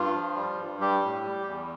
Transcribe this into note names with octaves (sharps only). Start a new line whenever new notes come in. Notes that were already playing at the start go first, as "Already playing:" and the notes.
Already playing: G2 F4
F3
G3
G2
G3 G4
A2
G3
E2